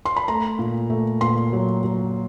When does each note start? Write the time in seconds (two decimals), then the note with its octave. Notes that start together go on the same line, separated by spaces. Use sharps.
0.05 C6
0.17 B5
0.28 A3 A#5
0.59 A#2
0.90 A3
1.21 A#2 C6
1.53 F#3
1.84 F#3